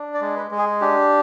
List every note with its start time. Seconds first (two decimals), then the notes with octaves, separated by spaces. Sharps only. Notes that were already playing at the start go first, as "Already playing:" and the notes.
Already playing: D4
0.14 D5
0.21 G#3
0.36 B4
0.51 G#3
0.58 G#4
0.81 D4 G4